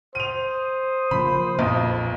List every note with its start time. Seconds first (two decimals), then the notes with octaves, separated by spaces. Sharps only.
0.15 C5 D#6 D#7 F7
1.11 C#3 F3 A#3 B5
1.58 B1 F2 A#2